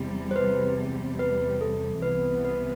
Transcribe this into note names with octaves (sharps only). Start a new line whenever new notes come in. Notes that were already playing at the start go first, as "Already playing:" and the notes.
Already playing: E2 C3 G3
C5
B4
B4
A4
C2 C3 E3 B3 B4
B4